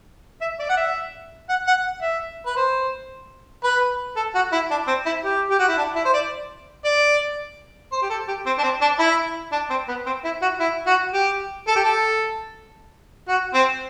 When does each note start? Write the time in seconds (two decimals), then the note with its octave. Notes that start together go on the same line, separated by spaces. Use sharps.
0.41 E5
0.59 D5
0.69 F#5
0.77 E5
1.49 F#5
1.67 F#5
2.02 E5
2.46 B4
2.56 C5
3.64 B4
4.16 A4
4.35 F#4
4.52 E4
4.71 D4
4.88 C4
5.06 E4
5.24 G4
5.51 G4
5.59 F#4
5.68 E4
5.78 D4
5.96 E4
6.05 C5
6.13 D5
6.85 D5
7.92 C5
8.02 G4
8.10 A4
8.28 G4
8.46 C4
8.58 D4
8.63 C4
8.81 D4
8.99 E4
9.52 D4
9.70 C4
9.88 B3
10.06 C4
10.24 E4
10.42 F#4
10.60 E4
10.87 F#4
11.14 G4
11.67 A4
11.76 G4
11.84 A4
13.28 F#4
13.54 C4